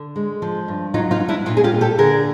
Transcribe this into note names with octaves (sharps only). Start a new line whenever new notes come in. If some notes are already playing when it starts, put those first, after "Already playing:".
Already playing: D3
G#3
F3
G2
F#3 D#4 F4
D#4 F4
F#3
D4 E4
A#2 D#4 F4
G#4
F4 G4
A#2
G4 A4
D3 G#4 A#4